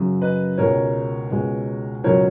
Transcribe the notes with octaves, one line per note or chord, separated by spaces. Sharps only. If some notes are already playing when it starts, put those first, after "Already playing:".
Already playing: F#2 C#3 F#3
B4 D#5
C#2 B2 G#3 A#4 C#5
C#2 B2 G#3
C#2 B2 F#3 A#4 C#5